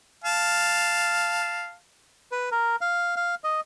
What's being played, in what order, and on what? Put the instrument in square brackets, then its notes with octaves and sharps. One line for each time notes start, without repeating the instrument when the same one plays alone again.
[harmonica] F5 A5
[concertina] B4
A#4
F5
F5
D#5